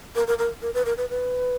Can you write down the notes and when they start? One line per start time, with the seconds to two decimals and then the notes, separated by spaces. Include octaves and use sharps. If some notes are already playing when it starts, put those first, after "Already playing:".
0.15 A#4
0.27 A#4
0.39 A#4
0.62 A#4
0.74 B4
0.85 A#4
0.97 B4
1.10 B4